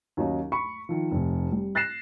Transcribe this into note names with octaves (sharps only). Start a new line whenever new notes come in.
D#2 F#3 C#4 D#4
B5 C#6 C#7
D#3 F3
F1 C3
G3
F#6 A6 A#6 C7 E7